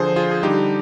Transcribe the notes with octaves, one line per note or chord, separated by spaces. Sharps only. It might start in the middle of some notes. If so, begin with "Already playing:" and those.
Already playing: D3 F3 G#4 C5
F4 G#4
G#4
D3 G3 D#4 G4